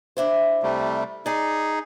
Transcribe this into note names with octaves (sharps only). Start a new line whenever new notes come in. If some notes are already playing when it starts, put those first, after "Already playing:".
D4 E4 C5
C3 G3 A3
D#4 G#4 D5 G#5